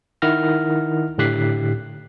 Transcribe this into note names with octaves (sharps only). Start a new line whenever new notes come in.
D#3 E4 F#5 F6 A#6
A2 D3 G4 F#6 B6 C7